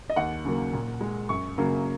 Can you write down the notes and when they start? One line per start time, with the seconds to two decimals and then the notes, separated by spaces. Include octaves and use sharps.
0.10 D#5
0.16 D#2 F#5
0.45 C#3 F#3 A#3
0.73 A#2
1.01 G#3
1.29 F#2 C#6
1.58 C#3 F#3 A#3